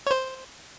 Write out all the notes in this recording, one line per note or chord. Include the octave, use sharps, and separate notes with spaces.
C#5
C5